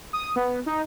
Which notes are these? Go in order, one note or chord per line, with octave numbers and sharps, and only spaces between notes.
D#6
B3
D#4